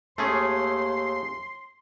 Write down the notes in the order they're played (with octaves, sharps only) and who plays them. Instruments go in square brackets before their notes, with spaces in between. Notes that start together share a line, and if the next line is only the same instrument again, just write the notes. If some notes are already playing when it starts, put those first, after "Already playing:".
[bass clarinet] D#2 [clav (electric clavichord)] A3 C#4 G#4 [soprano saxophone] C6